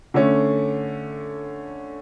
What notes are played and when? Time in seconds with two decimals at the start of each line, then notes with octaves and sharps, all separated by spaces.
0.14 D3 A3 C#4